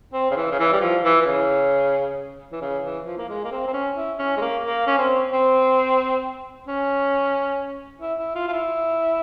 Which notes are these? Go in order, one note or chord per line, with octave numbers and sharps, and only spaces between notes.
C4
C#3
E3
C#3
E3
G3
F3
E3
E3
C#3
E3
C#3
E3
F3
A#3
G#3
A#3
C4
C4
C#4
E4
C#4
G#3
A#3
A#3
C#4
C4
C4
C#4
E4
E4
F4
F4
E4